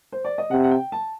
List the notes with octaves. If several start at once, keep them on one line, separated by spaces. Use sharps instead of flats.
C5
D5
D#5
C3 F#5
F#5
G5
A5